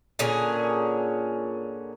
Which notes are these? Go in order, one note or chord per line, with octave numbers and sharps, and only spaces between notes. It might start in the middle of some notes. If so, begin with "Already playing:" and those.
A#2 D3 C#4 G#4